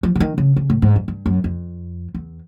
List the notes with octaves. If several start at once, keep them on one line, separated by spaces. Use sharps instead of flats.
F3
D3
D#3
C#3
C#3
A2
G#2
G2
G2
F#2
F2
E2